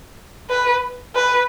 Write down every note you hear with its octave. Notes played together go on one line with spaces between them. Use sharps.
B4
B4